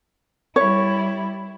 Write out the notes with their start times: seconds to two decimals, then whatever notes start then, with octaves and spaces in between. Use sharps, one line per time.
0.56 G3 E4 C#5